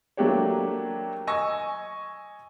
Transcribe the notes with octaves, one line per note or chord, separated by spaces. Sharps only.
F#3 A3 A#3 D4 G4 C#5
D#5 G#5 C#6 E6 A#6